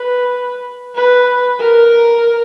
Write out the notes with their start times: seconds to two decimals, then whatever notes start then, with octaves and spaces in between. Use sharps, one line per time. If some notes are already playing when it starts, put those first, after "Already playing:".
Already playing: B4
0.95 B4
1.60 A#4